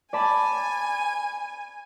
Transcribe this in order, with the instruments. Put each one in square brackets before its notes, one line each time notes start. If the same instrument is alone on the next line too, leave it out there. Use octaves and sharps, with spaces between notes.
[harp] D5 A5 B5 [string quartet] G#5